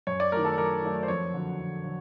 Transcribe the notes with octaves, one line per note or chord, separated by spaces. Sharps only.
F#2 C#5
D5
D#3 F#3 A3 A#4
A4
F#2 A#4
D#3 F#3 A3
C5
F2 C#5
D3 F#3
F2
D3 F#3